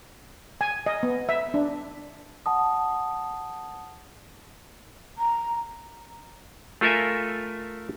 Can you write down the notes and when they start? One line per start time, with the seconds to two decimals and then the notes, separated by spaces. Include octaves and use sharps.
0.61 G#5
0.86 D#5
1.03 B3
1.29 E5
1.54 D4
2.46 F#5 A5 D#6
5.18 A#5
6.81 A3 F4 A4 A#4 E5 G#5